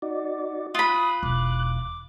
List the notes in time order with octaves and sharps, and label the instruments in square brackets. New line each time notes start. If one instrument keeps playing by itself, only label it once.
[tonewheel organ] D#4 F#4 D5
[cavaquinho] F4 B5 [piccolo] D#6 [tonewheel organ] F#6
[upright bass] E1 [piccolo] D6